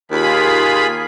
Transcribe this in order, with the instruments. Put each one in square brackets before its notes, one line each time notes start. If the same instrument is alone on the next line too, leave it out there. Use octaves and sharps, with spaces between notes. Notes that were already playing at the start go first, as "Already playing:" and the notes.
[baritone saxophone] D#2 [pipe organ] F4 G#4 B5